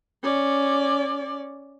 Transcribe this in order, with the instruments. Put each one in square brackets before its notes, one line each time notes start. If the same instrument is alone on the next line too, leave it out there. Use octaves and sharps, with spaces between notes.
[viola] C#4 D5